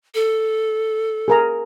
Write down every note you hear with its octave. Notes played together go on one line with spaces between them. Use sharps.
A4
G#4 A#4 A#5